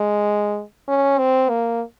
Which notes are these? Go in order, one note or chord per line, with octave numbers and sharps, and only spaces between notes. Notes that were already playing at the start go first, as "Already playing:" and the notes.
Already playing: G#3
C#4
C4
A#3